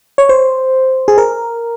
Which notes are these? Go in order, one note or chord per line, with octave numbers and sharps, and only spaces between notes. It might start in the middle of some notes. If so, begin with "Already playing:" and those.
C#5
C5
G#4
A#4